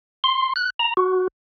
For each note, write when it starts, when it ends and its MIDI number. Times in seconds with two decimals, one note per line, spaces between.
0.24 0.53 84
0.56 0.70 90
0.79 0.94 82
0.97 1.28 66